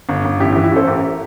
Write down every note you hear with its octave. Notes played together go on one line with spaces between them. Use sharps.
G1
G1
A1 E4 G4
E4 G4
E3
E4 G4
A1 A4 C5
A1 G4 A#4